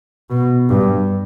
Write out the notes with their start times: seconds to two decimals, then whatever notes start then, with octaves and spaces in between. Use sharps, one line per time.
0.30 B2
0.69 G2